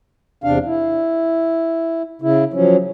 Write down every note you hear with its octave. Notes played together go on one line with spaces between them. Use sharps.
E2 C3 D4 F5
E4
C#3 E4
F3 F#3 C#4